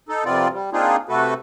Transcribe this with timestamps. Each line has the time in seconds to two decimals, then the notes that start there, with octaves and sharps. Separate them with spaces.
0.09 D#4 A4
0.25 F2 C3 B3 C4 F4 D5
0.53 G3
0.73 A#3 C4 D4 D#4 F4 G#4
1.09 C3 A3 F#4 A4 B4